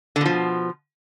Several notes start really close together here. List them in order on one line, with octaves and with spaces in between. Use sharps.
D3 B2 F3